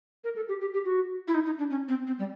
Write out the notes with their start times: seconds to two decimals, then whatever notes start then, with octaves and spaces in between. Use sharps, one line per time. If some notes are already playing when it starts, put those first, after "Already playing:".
0.24 A#4
0.36 A4
0.49 G4
0.61 G4
0.73 G4
0.85 F#4
1.28 E4
1.34 D#4
1.45 D#4
1.58 D4
1.70 C#4
1.89 C4
2.07 C4
2.19 G3